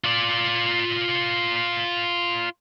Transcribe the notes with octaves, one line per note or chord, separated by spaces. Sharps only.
F4 D5